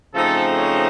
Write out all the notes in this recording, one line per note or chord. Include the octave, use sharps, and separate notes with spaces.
C#3 F3 A3 C4 D#4 A4
C#5